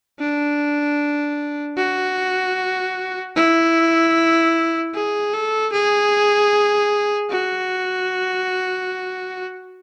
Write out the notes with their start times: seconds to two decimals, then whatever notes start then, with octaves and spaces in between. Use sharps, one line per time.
0.19 D4
1.77 F#4
3.36 E4
4.94 G#4
5.33 A4
5.73 G#4
7.30 F#4